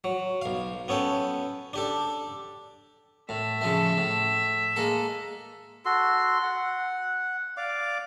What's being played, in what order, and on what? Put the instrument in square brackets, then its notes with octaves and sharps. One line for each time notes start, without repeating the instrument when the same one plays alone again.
[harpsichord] F#3
B1 F5
B3 C#4 A4 G5
D4 G4 A4
[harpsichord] A2 [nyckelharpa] E5
[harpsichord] C#3 F3 A3
A2
G#3 A#3 A4
[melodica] F#4 A4 C6
F#5
D5 F5 D6